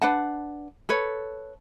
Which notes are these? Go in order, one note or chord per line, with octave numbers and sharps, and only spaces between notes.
D4 B4 F#5 A5
A4 B4 C#5